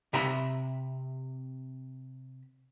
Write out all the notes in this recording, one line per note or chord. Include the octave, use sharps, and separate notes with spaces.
C3 E5 A#5 B5